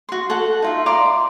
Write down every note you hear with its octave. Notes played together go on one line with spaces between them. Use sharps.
F#4 C6
A4 F#5
D#4 F4 E5
D5 A#5 C6 D6